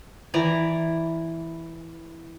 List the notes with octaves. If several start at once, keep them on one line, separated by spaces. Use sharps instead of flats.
E3 D5 A#5